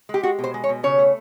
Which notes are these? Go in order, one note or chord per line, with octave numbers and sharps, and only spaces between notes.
G#3 G4
G#3 F#4
B2
C5
G#3
C#5
B2
C#3 C#5
A3